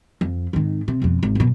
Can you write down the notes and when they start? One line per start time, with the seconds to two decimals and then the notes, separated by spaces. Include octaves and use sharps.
0.21 F2
0.53 G#1 D#3
0.88 C3
1.02 E1 F2
1.23 G#1
1.35 F#2 B2